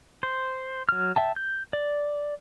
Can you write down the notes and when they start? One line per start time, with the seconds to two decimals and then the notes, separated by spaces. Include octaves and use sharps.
0.23 C5
0.89 F#3 F6
1.16 E5 G5 A5
1.36 G6
1.73 D5